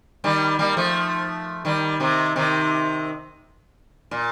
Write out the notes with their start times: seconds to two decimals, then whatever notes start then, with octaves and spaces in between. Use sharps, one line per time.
0.24 D#3 G3
0.59 G3 A#3
0.77 F3 A3
1.65 D#3 G3
2.00 C3 D#3
2.36 C3 D#3
4.11 A#2